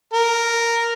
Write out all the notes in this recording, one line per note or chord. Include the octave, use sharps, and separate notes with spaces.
A#4